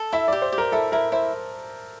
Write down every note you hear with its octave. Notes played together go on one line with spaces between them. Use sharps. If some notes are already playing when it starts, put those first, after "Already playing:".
Already playing: A4
E4 E5
G4 D5
C5
G4
A#4
E4 A4
E4 A#4
E4 C5